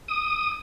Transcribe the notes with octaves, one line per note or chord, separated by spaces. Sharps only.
D#6